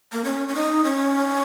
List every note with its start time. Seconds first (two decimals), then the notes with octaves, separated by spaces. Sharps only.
0.12 A#3
0.24 C#4
0.48 C#4
0.55 D#4
0.84 C#4